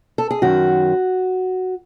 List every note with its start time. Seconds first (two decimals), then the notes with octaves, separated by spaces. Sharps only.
0.18 A4
0.31 G#4
0.42 F#2 D#3 F#4